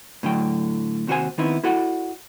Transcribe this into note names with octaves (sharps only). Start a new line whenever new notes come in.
A2 D3 F#3 G5
D#2 C3 F#4 G4 C5 G#5
D#3 B3 C4 D#4 E4
E4 F#4 A4 D5 F#5